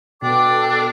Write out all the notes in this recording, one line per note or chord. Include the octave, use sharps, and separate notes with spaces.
B2 D4 A4 G5 D6